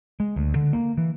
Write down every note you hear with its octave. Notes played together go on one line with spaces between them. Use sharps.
G#3
D2
D3
A#3
E3